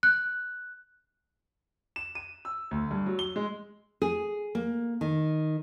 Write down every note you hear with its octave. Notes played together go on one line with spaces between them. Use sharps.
F#6
E7
D#7
E6
D2
G2
F#3
G7
G#3
G#4
A#3
D#3